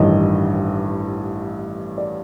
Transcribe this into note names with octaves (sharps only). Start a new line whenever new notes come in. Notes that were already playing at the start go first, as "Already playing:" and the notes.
Already playing: A1 G2 D#3 D#5
D5